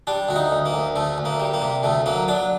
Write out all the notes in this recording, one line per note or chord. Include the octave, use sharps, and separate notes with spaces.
G3 D4
D2 F#4
D#4
D2
A#3
D2
D2 A3
D2
A#3
G3
A#3
C3
D2 A3
F#3 A#3
F#3 D4